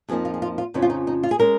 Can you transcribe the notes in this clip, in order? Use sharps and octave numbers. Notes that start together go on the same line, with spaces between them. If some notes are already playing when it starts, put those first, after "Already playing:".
F2 F3 A#3 D#4 G#4
F4
G#4
F4
F4
F2 C#3 F3 C#4 D#4
F4
D#4
D#4
F4
G#4
G#3 C#4 A#4